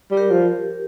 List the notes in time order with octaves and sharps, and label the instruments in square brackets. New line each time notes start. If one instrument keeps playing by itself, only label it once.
[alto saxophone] G3
[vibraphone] G4 A#4
[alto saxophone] F3